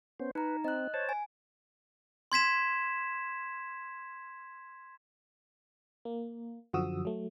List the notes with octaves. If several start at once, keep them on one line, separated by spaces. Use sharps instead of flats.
B3 C#4 C5
D#4 B4 A#5
C4 D#5 F#6
C5 C#5 A5
G#5
C6 G#6 B6 E7
A#3
F#2 D3 F3 F#4 D#6 E6
F#3 A3